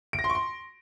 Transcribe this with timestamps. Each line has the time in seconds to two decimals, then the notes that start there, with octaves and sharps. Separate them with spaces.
0.13 D7
0.19 A#6
0.24 C6
0.30 C#6
0.35 C6